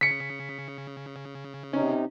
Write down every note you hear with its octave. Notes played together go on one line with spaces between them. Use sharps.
C#3 B6 C#7
C3 C#4 D#4